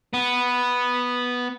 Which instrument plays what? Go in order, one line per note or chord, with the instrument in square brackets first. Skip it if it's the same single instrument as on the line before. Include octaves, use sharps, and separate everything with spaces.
[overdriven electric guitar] B3